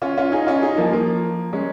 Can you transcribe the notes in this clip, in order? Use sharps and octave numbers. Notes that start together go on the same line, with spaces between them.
C#4 F4
C#4 F4
D#4 G#4
C#4 F4
D#4 G#4
F3 A#3
F3 A#3
G#3 C#4